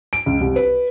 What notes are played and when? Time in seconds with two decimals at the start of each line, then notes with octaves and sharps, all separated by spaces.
0.13 D7
0.26 C#2
0.41 C2
0.56 B4